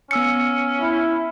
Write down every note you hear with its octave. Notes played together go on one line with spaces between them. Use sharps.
B3 C#4 E6 C#7
E4